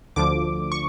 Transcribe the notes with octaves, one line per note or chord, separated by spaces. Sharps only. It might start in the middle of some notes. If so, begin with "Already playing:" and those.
D2 D3 F3 D6
C#6